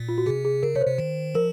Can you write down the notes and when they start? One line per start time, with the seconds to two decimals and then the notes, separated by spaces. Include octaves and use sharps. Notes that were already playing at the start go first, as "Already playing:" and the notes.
Already playing: A#2
0.09 F4
0.18 F#4
0.26 C3 G#4
0.45 G#4
0.63 C#3 A#4
0.75 C3 C#5
0.81 C5
0.87 C3
0.98 D#3
1.35 F3 A#4